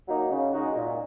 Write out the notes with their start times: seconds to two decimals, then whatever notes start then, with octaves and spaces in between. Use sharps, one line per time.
0.08 F#3 A#3 D#4
0.31 C#3
0.54 G#3 D#4 F#4
0.76 A#2